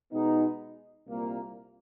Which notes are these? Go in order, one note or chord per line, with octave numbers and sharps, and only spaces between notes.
B2 G#3 B3 D#4
C2 A#2 G3 A#3